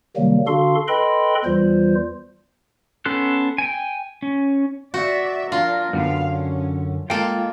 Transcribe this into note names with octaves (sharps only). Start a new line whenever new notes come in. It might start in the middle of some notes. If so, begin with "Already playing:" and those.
C3 D#3 F#3 G3 A#3
D3 D4 F#4 A4 F5 C6
A4 B4 D#5 G5 B5 C6
E2 E3 G3 F4 C5
B3 C#4 A4 C6 F#6
G5 G#5
C#4
F#4 D5 E5
F3 D4 F4 A#4
F#2 D3 B3 F5
C#4
G#3 A#3 F4 A4 F5 G5